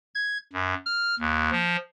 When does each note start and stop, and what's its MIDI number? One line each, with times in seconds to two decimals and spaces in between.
0.15 0.38 92
0.53 0.74 42
0.86 1.15 89
1.20 1.50 39
1.51 1.76 53